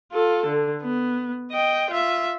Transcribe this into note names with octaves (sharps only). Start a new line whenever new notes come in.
F4 A4
D3
B3
D#5 G5
F4 E5